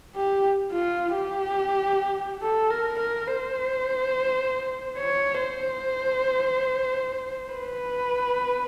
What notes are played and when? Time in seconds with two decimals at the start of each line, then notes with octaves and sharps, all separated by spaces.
0.16 G4
0.72 F4
1.14 G4
2.42 A4
2.70 A#4
2.99 A#4
3.27 C5
4.98 C#5
5.41 C5
7.53 B4